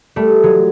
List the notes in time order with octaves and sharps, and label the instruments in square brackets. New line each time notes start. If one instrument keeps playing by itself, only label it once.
[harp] G3 A3
F#3 G#3